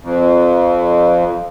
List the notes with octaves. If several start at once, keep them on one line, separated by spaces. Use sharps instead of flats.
F2